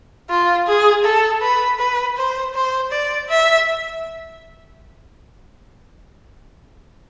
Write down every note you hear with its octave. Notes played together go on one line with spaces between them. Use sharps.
F4
G#4
A4
B4
B4
C5
C5
D5
E5